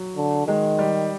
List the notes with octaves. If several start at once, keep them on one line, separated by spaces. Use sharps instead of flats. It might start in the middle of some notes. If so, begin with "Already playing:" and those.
Already playing: F#3
D3
D#3 G#3
G3